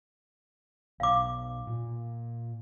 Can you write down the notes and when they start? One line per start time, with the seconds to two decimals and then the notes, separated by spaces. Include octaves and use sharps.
1.00 B1 B2 F5 D6
1.67 A#2 A#3